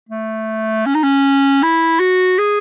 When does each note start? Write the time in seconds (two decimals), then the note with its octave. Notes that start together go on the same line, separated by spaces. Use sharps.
0.09 A3
0.86 C#4
0.95 D#4
1.03 C#4
1.63 E4
2.00 F#4
2.38 G#4